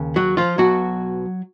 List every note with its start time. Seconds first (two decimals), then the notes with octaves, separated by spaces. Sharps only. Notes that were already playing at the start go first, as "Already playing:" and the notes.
Already playing: D#2 C#3
0.16 F#3 F#4
0.37 F3 F4
0.58 B1 B2 F#3 F#4